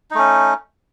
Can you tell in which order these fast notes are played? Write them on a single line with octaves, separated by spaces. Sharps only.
D#4 A3 C#4